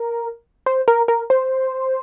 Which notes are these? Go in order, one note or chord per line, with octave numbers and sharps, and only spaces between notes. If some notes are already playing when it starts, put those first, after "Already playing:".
Already playing: A#4
C5
A#4
A#4
C5